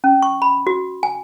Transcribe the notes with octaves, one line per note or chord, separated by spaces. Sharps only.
C#4
C#6
B5
F#4
G#5